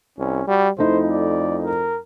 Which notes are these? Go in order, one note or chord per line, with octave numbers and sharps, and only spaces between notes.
C2 C#4
G3 F#4
F2 A3 D#4 E4 C5
D5
A#4